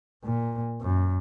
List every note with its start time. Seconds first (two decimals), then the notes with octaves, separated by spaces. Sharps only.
0.24 A#2
0.82 F#2